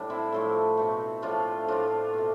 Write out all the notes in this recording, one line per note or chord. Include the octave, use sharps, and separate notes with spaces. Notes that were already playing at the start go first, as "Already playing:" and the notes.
Already playing: A2 G3 D4
C4 E4
A2 F3 A3
B2 A3
A2 F3 A3 D4 F4
A2 F3 A3 D4 F4
B2 A3